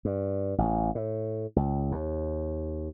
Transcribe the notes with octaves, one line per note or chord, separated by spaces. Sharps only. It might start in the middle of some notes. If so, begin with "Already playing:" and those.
G2
A1
A2
C#2
D#2